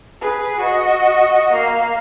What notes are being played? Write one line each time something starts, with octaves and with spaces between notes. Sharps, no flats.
G#4 B4
F#4 D#5
A#3 F5